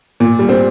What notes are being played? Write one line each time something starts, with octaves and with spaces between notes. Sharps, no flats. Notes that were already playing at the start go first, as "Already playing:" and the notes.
A#2
G3
C4